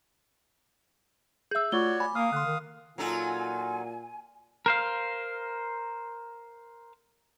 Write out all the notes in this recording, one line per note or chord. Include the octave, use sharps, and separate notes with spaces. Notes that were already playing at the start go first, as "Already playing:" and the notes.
G#4 E5 E6 G6
A3 F4 F#4 C#5 D5 G7
G#5 B5 D6
A#3 F5 D#6 F6
D3 C6 F#6
D#3
A#2 F#3 D#4 F4 A4 G#5
A#4 C5 F5